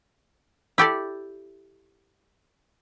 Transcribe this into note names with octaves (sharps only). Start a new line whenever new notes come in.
E4 G4 A4 D5